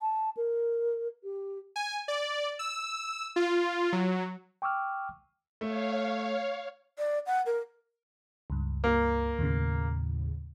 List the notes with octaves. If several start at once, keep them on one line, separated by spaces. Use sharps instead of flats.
A5
A#4
G4
G#5
D5
E6
F4
F#3
G5 C#6 D6 E6 F6
A3 C#5 F5
D5
F#5
A#4
C#2 G2
A#3
D#2 A2 C#3